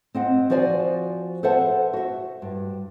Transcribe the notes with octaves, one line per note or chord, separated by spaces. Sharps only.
C4 D#5 F#5
F3 F#4 C5 D5 E5 G#5
A4 B4 C5 E5 F#5 A5
F#4 E5
G2